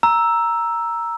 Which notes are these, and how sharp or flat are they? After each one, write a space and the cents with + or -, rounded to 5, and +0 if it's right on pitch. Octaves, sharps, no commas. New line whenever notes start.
A#5 +0 E6 +0